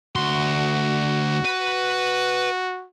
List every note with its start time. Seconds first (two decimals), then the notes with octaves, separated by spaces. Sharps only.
0.16 D2 F#4 C6
1.45 B4